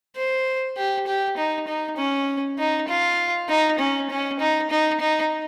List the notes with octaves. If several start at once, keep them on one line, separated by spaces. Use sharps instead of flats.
C5
G4
G4
D#4
D#4
C#4
D#4
F4
D#4
C#4
C#4
D#4
D#4
D#4